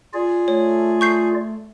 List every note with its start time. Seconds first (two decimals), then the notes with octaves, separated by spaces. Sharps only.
0.14 F4 G#4 D5
0.48 A3 C#5
1.01 C#6 G6 C7